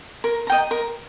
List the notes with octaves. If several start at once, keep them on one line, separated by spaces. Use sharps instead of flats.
A#4
D#5 G5 A#5
A#4